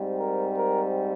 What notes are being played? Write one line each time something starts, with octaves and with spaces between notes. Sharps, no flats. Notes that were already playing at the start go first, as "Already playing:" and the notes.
Already playing: G#2 G3 C4
A#4
A#4